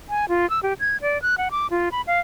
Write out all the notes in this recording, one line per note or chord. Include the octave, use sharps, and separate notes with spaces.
G#5
F4
E6
G4
G#6
D5
F#6
F#5
D6
F4
B5
F5